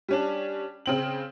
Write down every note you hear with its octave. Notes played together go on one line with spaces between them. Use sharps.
G3 C#4 D4
C#3 C4 F#7